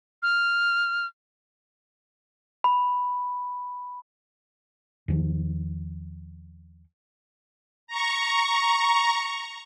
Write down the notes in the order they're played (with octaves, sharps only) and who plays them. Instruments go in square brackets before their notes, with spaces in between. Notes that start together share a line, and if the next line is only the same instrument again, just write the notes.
[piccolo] F6
[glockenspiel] B5
[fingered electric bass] E2 D#3 F3
[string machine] A#5 C#6